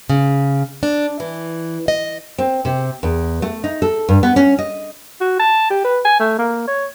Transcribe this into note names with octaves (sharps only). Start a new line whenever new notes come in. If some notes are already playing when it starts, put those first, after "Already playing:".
C#3
D4
E3
D#5
C4
C3
E2
A3
D#4
A4
G2
B3
C#4
D#5
F#4
A5
G4
B4
G#5
A3
A#3
C#5